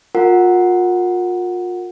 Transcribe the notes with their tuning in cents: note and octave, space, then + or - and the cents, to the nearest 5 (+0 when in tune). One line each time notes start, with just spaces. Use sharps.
F4 +35 A#4 -10 F#5 +0